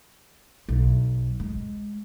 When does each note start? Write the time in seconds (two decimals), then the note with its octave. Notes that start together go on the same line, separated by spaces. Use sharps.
0.68 B1
1.40 G#3